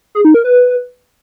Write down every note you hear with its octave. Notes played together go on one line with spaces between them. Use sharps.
G#4
D#4
A#4
B4